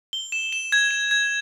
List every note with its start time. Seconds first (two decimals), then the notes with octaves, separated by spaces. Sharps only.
0.13 G7
0.32 E7
0.53 E7
0.72 G#6
0.91 E7
1.11 G#6